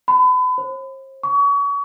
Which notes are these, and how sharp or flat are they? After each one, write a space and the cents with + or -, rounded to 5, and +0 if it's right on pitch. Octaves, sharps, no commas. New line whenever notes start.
B5 +35
C5 +40
C#6 +35